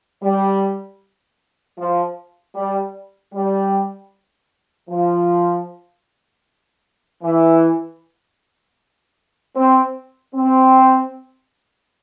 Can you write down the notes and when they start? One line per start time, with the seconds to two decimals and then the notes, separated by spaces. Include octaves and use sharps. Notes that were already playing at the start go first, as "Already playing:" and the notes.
0.22 G3
1.78 F3
2.56 G3
3.34 G3
4.90 F3
7.23 E3
9.56 C4
10.34 C4